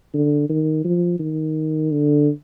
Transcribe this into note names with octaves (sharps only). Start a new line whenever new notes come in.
D3
D#3
F3
D#3
D3